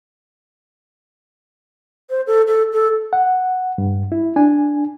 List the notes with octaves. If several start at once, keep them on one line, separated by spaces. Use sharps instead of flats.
C5
A4
A4
A4
F#5
G2
E4
D4 G#5